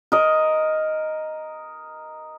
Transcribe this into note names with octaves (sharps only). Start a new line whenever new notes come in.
A#4 D#5